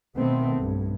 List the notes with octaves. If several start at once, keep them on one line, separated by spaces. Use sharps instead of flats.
B2 D#3 A3 B3 C4
B1 G2